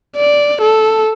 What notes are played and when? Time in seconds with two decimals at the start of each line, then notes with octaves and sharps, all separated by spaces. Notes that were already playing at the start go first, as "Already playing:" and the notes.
0.16 D5
0.62 A4